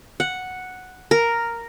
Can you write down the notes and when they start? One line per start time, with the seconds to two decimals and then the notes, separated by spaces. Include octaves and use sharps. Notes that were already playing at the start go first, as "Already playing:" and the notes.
0.20 F#5
1.11 A#4